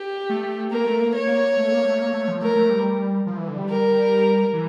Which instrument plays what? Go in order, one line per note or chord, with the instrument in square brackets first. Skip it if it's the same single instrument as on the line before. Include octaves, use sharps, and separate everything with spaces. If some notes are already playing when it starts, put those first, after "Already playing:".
Already playing: [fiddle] G4
[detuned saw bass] A3
[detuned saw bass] A#3 [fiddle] A#4
[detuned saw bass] A3
A#3
[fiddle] C#5
[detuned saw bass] A#3
A3
A#3
A3
A#3
A3
F3
[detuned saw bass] A3 [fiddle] A#4
[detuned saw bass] A3
G3
F3
E3
D3
G3
[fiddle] A#4
[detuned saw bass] E3